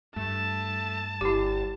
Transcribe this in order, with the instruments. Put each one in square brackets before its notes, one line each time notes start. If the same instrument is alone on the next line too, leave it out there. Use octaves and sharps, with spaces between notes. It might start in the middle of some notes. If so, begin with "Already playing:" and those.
[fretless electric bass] G2 [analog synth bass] A3 [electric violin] A5
[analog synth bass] G1 [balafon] E4 G4